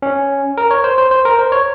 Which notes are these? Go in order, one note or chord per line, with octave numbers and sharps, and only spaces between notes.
C#4
A#4
C#5
C5
C5
C5
A#4
C5
C#5